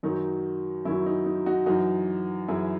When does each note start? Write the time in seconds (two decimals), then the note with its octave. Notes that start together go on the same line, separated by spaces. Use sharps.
0.03 F#2 D#3 F#3 D#4
0.85 F#2 D#3 F#3 C#4 E4
1.06 D#4
1.26 D#4
1.46 D#4 F#4
1.66 F#2 E3 D#4 F#4
2.48 F#2 E3 E4 G#4